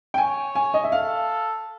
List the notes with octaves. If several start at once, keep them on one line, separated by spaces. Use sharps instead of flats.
G5
C#5 G#5
G#5
D#5
E5
A4 F5